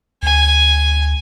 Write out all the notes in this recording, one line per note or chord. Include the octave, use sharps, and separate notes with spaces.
D2 G#5